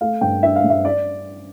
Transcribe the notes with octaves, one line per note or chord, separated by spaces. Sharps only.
A3 F5
G2 G5
D4 E5
F5
G2
E5
D5